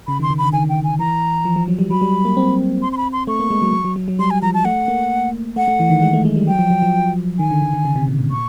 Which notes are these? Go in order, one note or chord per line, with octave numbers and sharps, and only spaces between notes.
C#3 B5
D#3
C6
D#3
D3 B5
D#3 G#5
G5
G#5
E3 A#5
F3
F3
F#3
G3
F#3 B5
G3
A#3
C4
C6
C6
B5
C6
A3 C#6
A#3
G#3
F#3
F#3
F#3
F#3
F#3
G3 C6
G#5
F3 A#5
A5
A3 F#5
A#3
A3 F#5
A3
E3
D#3
G#3
A3
G#3
G3
F#3 G5
F3
F#3
F3
D#3 G#5
D3
D#3
D3
C#3
C3
A#2
A2
A#2 C#6